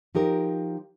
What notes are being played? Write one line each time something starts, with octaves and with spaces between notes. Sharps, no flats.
F3 D#4 G4 A#4